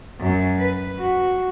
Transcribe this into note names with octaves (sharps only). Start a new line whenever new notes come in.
F#2
B4
F#4